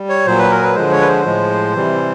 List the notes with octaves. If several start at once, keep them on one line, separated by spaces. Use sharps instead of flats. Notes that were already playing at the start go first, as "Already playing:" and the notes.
Already playing: G3
C#5
A#2 F#3 C5
B4
A#4
B4
D3 F3 G#3 C5
C#5
B4
C5
A2 F3 G#3
C3 E3 G3